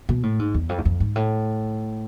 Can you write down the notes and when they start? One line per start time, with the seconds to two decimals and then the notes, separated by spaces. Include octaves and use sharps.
0.09 B2
0.23 A2
0.39 G#2
0.54 E2
0.69 F2
0.78 E2
0.85 F2
1.00 G#2
1.16 A2